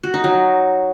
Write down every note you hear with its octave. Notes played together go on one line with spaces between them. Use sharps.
F#4
D#4
F#3